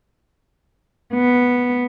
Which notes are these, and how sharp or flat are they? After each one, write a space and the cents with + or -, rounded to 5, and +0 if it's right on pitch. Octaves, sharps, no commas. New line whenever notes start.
B3 -5